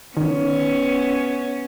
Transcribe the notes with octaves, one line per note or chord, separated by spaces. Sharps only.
D#3 B3 C#4